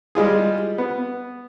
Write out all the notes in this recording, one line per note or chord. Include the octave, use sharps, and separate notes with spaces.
G3 G#3 F4 G#4
B3